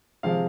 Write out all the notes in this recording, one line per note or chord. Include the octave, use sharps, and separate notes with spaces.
C3 F3 G#3 F5